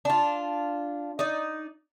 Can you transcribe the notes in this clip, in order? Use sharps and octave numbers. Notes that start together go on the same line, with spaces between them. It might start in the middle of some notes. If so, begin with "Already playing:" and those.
D4 F4
D#4 D5